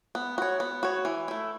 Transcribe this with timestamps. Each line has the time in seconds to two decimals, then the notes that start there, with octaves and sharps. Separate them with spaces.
0.15 B3
0.38 F#4 C#5
0.60 B3
0.83 F#4 C#5
1.05 E3
1.28 A3 E4